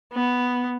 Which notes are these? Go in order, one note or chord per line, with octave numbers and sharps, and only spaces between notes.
B3